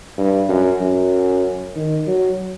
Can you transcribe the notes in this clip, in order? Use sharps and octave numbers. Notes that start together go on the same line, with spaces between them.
G2
F#2
F#2
D#3
F#3